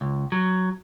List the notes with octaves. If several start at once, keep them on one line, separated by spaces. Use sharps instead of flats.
C#2
F#3